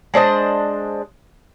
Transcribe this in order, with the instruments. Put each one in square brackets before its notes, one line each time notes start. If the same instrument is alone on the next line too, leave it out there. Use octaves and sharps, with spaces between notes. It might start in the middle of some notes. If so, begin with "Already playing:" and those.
[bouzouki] G#3 D4 C5 D#5